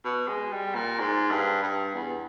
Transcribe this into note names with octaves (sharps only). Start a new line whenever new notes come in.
B2
G#3
G3
A#2
G#2
G2
G2
E2